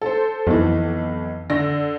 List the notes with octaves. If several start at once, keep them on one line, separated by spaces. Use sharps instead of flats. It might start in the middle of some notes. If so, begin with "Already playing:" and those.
A4 C5
B1 F2 E3
D3 A#6